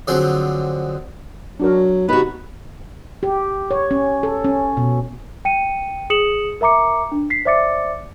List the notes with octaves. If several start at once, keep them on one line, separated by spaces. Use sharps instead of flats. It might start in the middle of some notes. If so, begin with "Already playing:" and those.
D3 F3 F#3 C4 G#4
F#3 D4 F#4 A#4
C3 B3 D#4 F#4 B4
G4
C#5
C#4
A4
C#4
B2
G5 C#7 D#7
G#4 D#6 C#7 E7 F#7
A#4 E5 A#5 D6 C#7
D4
B6 C7
C5 D5 E5 D6 A6 C#7